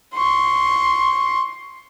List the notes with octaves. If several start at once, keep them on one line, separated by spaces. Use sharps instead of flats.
C6 C#6